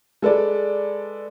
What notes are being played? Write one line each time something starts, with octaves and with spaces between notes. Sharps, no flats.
G#3 A4 B4 D5